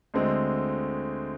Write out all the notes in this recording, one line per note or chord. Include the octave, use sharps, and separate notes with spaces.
D2 D3 G#3 C4